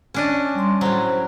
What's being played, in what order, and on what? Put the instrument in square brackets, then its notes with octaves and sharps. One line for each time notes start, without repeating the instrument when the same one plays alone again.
[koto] C#4 D4 D#5
[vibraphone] G3 C6
[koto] A2 F#3 [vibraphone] C5